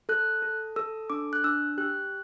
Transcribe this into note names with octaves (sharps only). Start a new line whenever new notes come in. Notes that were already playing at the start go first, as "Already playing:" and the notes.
A4 F#6
A4
A4 E6
D4 D6
F#6
D4 E6
G4 F#6